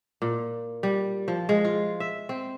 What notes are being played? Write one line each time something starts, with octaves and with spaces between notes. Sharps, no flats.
A#2
G3
F3
G#3
F4
E5
C4